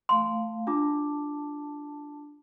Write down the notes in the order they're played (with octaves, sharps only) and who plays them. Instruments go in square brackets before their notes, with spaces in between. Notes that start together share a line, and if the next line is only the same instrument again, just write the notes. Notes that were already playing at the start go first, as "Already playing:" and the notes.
[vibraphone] A3 F5 [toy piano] C6
[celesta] D4 F4 D6 [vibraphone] A5